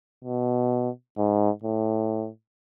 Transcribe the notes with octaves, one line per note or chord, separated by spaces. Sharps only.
B2
G#2
A2